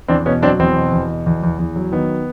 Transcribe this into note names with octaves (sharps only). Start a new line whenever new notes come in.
E2 C4 D4
B2 B3 C#4
F#3 C4 D4
E2 C4
B2
E2
B2
E2
E2
E2
F#3
D#3 B3